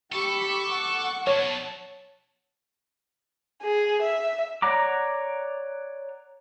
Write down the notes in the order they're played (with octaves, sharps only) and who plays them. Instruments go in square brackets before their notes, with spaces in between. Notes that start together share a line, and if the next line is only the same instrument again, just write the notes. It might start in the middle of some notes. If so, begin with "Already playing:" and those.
[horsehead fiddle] G4 B5 [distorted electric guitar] A4 [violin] C#6 D6
[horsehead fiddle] F#5
[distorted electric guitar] B2 F#3 [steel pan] C#5 [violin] A5
[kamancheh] G#4
E5
[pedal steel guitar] C#5 D5 F#5 A#5 D6